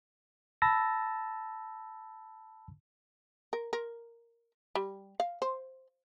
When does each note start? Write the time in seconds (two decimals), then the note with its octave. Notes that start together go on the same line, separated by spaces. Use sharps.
0.62 A5 B5 E6 A6 A#6
3.53 A#4
3.73 A#4
4.75 G3
5.20 F5
5.42 C5